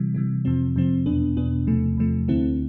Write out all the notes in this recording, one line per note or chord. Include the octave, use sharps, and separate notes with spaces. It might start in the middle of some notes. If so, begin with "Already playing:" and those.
Already playing: C3 E3 G3
C3 E3 G3
F2 C3 F3 C4
F2 C3 F3 C4
E2 B2 B3 D4
E2 B2 B3 D4
E2 C3 F3 A3
E2 C3 F3 A3
D2 D3 A3 C4 E4